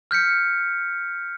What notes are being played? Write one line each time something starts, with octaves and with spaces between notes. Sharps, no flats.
F6 G6 B6 C#7